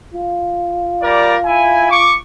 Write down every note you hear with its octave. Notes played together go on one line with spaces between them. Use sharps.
F4
G3 A#4 D5
E4 E5 G#5
C#6 D6